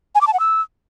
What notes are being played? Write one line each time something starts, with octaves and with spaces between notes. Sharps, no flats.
G#5
D6
A5
F#5
E6